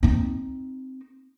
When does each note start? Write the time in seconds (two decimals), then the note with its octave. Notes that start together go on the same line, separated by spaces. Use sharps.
0.03 C4 D#4